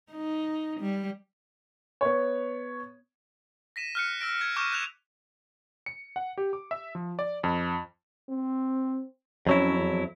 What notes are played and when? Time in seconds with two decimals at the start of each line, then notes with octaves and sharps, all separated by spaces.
0.12 D#4
0.80 G3
2.01 B3 C#5
3.76 A#6 B6 D#7 E7
3.95 F6 F#6 C#7
4.21 E6 A#6 D7
4.41 G#6 C#7
4.56 C#6 D6 F6 G6 E7
4.73 F#6 E7 F7
5.86 C#7
6.16 F#5
6.38 G4
6.53 D6
6.71 E5
6.95 F3
7.19 D5
7.44 F2
8.29 C4
9.47 F2 F#3 C#4 E4
9.77 E2